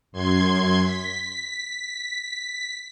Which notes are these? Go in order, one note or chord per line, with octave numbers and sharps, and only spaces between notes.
F#2 C6 G#6
B6